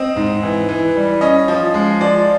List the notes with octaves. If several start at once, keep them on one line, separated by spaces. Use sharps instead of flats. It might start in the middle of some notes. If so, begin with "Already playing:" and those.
Already playing: C4 D#5
G#2
E3
E3
G3
C#4 D#5
F3
G#3
F3 D5